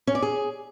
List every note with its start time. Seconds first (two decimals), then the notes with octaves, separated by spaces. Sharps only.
0.07 C#4
0.15 D5
0.22 G#4